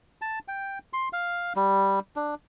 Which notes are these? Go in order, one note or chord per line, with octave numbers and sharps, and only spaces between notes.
A5
G5
C6
F5
G3
D4